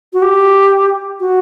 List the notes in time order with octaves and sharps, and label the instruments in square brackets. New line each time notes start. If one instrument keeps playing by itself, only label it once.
[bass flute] F#4
G4
F#4